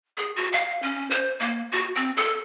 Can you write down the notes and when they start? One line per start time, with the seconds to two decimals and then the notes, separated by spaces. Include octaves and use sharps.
0.17 G#4
0.36 F#4
0.53 F5
0.82 C#4
1.10 C5
1.40 A#3
1.72 F#4
1.95 C4
2.17 A4